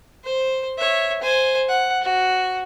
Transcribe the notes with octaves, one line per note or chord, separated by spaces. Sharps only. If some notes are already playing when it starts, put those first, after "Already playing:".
C5
C#5 E5
C5 G#5
F#5
F#4